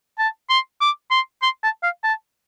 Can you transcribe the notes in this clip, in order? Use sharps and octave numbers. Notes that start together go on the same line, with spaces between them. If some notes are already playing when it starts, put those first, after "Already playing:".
A5
C6
D6
C6
C6
A5
F5
A5